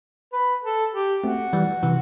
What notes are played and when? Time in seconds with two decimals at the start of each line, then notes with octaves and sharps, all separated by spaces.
0.33 B4
0.64 A4
0.94 G4
1.24 A3 C4 F#4
1.53 E3 G3
1.83 C3 E3